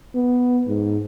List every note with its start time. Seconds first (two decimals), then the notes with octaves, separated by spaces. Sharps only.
0.14 B3
0.68 G#2